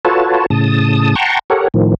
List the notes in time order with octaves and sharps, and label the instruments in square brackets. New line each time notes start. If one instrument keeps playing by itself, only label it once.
[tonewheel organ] F4 F#4 A4 B4 C#5 A5
A2 C#3 A5 D#6
F#5 G5 A5 A#5 C6 C#6
G4 A4 A#4 C#5 F#5
A2 D#3 F3